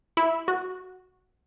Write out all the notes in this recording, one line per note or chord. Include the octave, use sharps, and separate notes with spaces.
E4
F#4